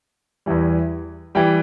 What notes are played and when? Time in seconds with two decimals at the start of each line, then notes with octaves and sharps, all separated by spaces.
0.46 E2 E3 G3
1.35 E3 G3 G5